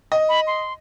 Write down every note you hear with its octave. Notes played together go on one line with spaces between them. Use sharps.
D#5
B5
C6